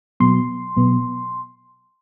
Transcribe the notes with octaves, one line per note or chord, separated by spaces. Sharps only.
B2 F#3 B3 C6
B2 F#3 B3